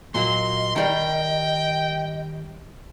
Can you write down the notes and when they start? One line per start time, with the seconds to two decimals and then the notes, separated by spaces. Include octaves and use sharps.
0.15 A#2 F#3 A#3 D#5 C6
0.76 D#3 G3 A#4 G5